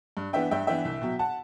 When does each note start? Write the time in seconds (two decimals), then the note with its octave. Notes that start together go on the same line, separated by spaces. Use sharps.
0.17 G2
0.33 E3 B3 D4 E5 G5
0.51 G2 E5 G5
0.67 E3 B3 D4 E5 G5
0.85 C2
1.01 B2 F#3
1.19 F#5 A5